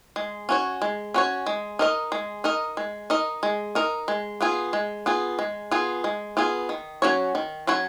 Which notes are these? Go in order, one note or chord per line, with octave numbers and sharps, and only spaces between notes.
G#3
C#4 F#4 C#5
G#3
C#4 F#4 C#5
G#3
D#4 A#4 D#5
G#3
D#4 A#4 D#5
G#3
D#4 A#4 D#5
G#3
D#4 A#4 D#5
G#3
B3 F4 G#4
G#3
B3 F4 G#4
G#3
B3 F4 G#4
G#3
B3 F4 G#4
D#3
F#3 C#4 F#4 C#5
D#3
F#3 C#4 F#4 C#5